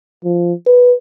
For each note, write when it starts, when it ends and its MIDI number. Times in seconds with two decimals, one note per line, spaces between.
0.24 0.53 53
0.66 0.93 71